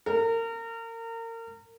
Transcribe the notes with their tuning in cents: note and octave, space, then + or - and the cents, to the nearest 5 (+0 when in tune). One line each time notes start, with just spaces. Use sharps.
A#4 -30